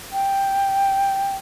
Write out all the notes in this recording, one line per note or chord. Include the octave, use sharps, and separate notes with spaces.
G5